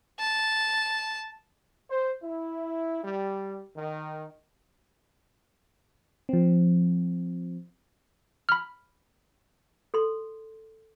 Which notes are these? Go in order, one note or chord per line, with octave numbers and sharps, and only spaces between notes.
A5
C5
E4
G3
D#3
F3 C4
B5 F6
A4 C6